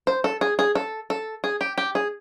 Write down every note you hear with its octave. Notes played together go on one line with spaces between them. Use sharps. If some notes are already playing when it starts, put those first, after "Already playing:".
C5
A4
G#4
G#4
A4
A4
G#4
G4
G4
G#4